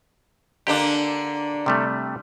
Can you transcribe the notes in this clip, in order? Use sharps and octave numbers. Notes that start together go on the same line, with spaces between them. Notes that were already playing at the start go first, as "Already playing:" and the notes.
D3 A#3 D4 G4
C3 G3 A3